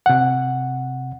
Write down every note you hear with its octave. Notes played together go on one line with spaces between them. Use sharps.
C3 F#5